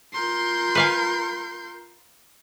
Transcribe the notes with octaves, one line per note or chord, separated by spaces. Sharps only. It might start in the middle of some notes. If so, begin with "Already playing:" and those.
F4 A#4 C6 G6
B4 F5 G#5